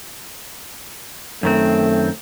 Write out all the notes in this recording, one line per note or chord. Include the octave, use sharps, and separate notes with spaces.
F#2 D#3 A3 C4